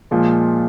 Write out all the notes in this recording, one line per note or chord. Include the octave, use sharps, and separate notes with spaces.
A#2 F3 G#3